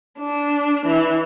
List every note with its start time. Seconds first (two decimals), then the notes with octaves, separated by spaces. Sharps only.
0.19 D4
0.86 E3